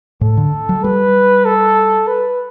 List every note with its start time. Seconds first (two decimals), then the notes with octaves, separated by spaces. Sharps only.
0.21 A2 A4
0.37 D3
0.69 F#3
0.84 G3 B4
1.45 A4
2.07 B4